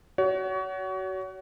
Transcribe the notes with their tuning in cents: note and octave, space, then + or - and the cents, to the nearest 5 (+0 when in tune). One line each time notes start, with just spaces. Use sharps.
F#4 +25 C#5 +35